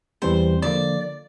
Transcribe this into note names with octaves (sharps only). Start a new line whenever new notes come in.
E2 E3 G3 C4 C5
D3 F3 A#3 D5